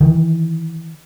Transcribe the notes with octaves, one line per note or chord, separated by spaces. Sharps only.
D#3 E3